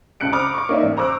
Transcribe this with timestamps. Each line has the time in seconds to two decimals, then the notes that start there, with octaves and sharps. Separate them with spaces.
0.20 C#2 C3 A5 F#6 C#7 D7
0.32 C5 A#5 B5 D6 D#6 F6
0.54 C#6 D6
0.69 A#3 D#4 C#5 D5 E5
0.83 A1
0.97 C5 A#5 C#6 D6 E6 F#6